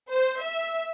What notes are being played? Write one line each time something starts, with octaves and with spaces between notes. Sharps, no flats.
C5
E5